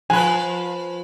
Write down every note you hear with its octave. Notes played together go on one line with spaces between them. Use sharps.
F3 B4 G#5